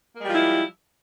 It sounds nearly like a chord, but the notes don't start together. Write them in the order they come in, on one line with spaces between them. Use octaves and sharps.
A#3 G#3 G3 F3 E4